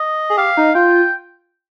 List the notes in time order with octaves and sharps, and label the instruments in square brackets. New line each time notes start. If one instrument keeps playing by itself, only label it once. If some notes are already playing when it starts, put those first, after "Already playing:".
Already playing: [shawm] D#5
[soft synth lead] G#4
[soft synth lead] G4 [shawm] F5
[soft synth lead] D#4
[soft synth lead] F4 [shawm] G5